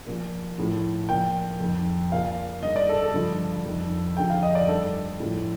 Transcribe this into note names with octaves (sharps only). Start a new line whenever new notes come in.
A#2 F3
A2 F3
A#2 F3 G5
F2 D#3
A#2 F3 F5
G2 D#3 D#5
D5
A4
A4
G2 D3 F3
F2 D#3
F2 D3 F3 G5
F5
D#5
D5
G2 D#3 A4
A2 F3